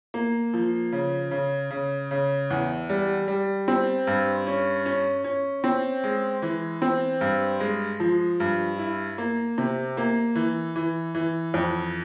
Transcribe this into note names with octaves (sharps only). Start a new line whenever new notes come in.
A#3
F3
C#3
C#3
C#3
C#3
E2
G3
G3
C4
G2
C#4
C#4
C#4
C4
G#3
E3
C4
G2
G#3
F3
G2
E4
A#3
C3
A#3
E3
E3
E3
F2